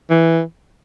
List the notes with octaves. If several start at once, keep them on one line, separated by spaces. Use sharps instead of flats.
E3